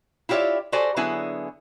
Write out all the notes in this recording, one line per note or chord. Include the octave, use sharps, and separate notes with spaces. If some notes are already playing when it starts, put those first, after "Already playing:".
E4 F4 G4 C#5 D5 E5
F#4 G4 A4 C5 D5 G#5
D3 F#3 B3 E4 G#4 G#5